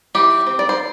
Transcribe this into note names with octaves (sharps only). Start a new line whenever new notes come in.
E3 G4
C4
D5
C5